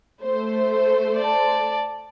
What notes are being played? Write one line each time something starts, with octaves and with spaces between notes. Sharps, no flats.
A3 C5
D5 A5